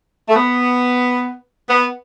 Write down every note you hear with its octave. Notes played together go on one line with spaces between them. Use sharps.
A3
B3
B3